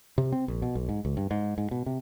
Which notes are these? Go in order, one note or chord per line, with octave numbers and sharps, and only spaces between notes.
C3
C4
A#1
B2
B1
G#2
C#2
G2
G#2
G#2
B2
C3